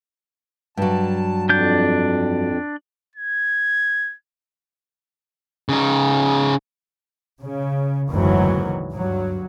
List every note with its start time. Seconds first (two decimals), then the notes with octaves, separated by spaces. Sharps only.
0.77 G2 F#3 A5
1.49 F2 D4 G6
3.16 G#6
5.69 C#3 D#4
7.42 C#3
8.10 F#1 D2 G#2 D#3 E3 F#3
8.94 G2 F#3